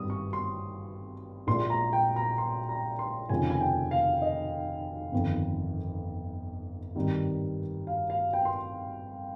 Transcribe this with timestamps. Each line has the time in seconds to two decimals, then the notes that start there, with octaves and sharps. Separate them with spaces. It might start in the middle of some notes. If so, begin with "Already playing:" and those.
Already playing: G#1 G2 G3 D#6
0.10 C#6
0.33 C6
1.47 A#1 A#2 G#3 C6
1.70 A#5
1.93 G5
2.16 A#5
2.38 C6
2.69 A#5
2.99 C6
3.29 F1 D#2 C#3 F3 G#3 G#5
3.50 G#5
3.61 G5
3.91 F5
4.22 D#5
5.12 G1 F2 D#3
6.95 G#1 G2 D#3 G3
7.87 F5
8.10 F5
8.33 G5
8.45 C6